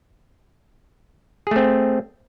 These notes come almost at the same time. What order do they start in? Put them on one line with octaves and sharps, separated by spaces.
G#4 A3 C4